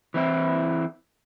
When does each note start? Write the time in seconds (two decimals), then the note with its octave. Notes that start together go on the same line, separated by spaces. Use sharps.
0.14 E3 C4 E4